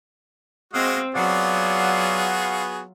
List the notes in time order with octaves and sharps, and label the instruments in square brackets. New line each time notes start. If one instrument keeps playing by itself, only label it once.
[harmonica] G#3 F#4 D#5 [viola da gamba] C4 [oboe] F5
[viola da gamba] F#3 F4 [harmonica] B3 F#4 G#4 [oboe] D5 [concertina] F5 F#5